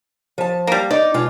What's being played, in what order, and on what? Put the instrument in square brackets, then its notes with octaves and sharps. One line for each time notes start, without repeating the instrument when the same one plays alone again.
[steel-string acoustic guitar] F3 A5
[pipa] G3 A#3
[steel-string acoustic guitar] D#4 [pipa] D5
[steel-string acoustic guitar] B2 G#3 F4